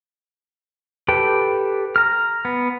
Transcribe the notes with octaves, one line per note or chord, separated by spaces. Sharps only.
G4 A4 B4 G5
A#5 F6
B3